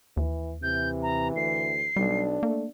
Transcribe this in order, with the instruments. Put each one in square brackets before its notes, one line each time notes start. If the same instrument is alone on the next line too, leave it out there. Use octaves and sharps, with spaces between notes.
[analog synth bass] D#2 [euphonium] E3
[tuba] C3 [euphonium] E3 [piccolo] G6
[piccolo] A#5
[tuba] D2 [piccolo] C7
[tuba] B1 [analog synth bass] G3 [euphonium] D4
[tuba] A3 [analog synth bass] A#3